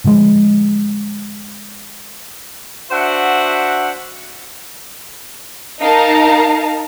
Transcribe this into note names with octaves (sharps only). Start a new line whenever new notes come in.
A2 D3 F3 G#3
D4 F#4 C5 E5 F#5
D#4 A#4 F5 A5 A#5